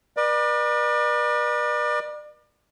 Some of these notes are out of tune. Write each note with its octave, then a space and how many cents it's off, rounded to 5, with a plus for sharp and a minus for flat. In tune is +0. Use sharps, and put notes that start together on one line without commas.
B4 -40 D5 +35